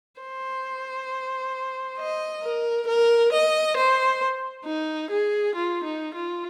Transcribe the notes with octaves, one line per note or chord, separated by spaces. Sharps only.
C5
D#5
A#4
A#4
D#5
C5
D#4
G#4
F4
D#4
F4